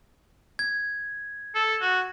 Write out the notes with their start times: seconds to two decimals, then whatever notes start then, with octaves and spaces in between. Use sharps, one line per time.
0.59 G#6
1.55 A4
1.81 F#4